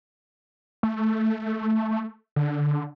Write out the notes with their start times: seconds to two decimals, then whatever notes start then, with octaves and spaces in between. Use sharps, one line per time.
0.83 A3
2.36 D3